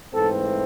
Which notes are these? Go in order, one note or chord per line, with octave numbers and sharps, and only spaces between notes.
G#2 E3 A3 C4 A4